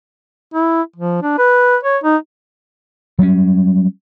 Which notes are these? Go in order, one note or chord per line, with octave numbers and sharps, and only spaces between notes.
E4
F3
D4
B4
C#5
D#4
F#3 G3 A#3 C#4